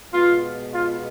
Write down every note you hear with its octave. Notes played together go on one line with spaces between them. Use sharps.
B2 G#3 B3 F4
F4